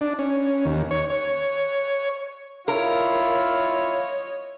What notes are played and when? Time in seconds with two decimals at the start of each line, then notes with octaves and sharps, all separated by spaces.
0.01 D4
0.19 C#4
0.65 D#2
0.91 C#5
1.10 C#5
2.68 E4 F4 A#4 C#5 D#5